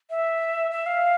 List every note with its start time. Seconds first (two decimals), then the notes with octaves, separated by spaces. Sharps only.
0.10 E5
0.71 E5
0.86 F5